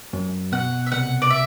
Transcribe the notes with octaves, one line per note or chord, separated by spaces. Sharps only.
F#2
B2 F#5
E5
C2 F#5
D5
E5